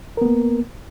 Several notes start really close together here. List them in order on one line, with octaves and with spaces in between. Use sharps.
A#4 B3 A#3